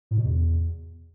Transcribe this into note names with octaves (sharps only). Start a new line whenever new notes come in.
A2
B2
E2